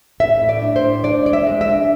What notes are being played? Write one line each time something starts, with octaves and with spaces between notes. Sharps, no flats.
A2 E5
A2
D5
D4
C5
A2
D4 D5
G#3 D5
E5
G#3
E5
D4